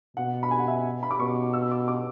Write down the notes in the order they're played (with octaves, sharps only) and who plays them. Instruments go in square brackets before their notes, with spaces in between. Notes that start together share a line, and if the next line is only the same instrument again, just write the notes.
[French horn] B2 [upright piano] F#5
[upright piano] B5
G#5
F#5
E5
B5
D6
[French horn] B2 [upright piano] C#6
[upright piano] E6
D6
D6